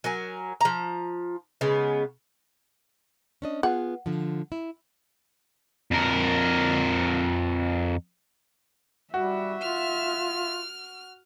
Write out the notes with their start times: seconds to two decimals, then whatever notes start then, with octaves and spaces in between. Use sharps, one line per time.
0.04 F#3 A#4 G#5
0.61 F3 A#5
1.61 C#3 G#3 B3
3.42 C#4 D4 D#5
3.63 B3 F4 G#4 F#5
4.06 D3 F3
4.52 E4
5.91 F2 A#4
9.14 G3 F#4 E5
9.62 F4 F6